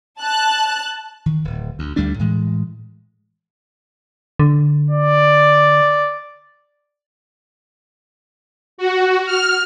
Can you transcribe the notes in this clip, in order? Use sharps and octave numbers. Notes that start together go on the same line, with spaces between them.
A5 F#6
D#3
D1
D2
D2 G3 A3 D4
A2 E3 G#3
D3
D5
F#4
F6